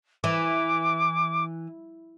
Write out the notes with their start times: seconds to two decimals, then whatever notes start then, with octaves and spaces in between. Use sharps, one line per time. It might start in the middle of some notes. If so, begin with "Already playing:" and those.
0.24 E3 D6